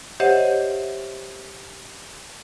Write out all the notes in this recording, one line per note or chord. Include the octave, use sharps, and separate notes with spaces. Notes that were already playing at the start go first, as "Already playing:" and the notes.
G4 C5 C#5 D#5 E5 F#5